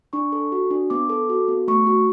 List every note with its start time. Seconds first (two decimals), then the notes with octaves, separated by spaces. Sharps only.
0.13 D4 C#6
0.32 A4
0.52 F#4
0.71 D4
0.90 B3 D6
1.09 A4
1.29 F#4
1.48 B3
1.68 A3 C#6
1.87 F#4